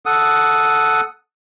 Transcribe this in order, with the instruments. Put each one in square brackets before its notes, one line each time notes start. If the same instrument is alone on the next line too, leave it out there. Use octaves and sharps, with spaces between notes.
[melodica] A4 F#5 D#6